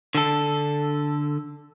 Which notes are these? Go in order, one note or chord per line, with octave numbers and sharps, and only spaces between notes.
D3 A4